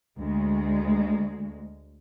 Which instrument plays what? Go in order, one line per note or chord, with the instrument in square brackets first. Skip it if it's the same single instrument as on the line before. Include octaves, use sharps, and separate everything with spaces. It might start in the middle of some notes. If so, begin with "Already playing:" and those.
[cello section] D2 G#3